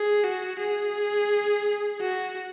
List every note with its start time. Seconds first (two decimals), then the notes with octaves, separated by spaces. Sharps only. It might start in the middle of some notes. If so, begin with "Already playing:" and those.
Already playing: G#4
0.24 F#4
0.60 G#4
2.01 F#4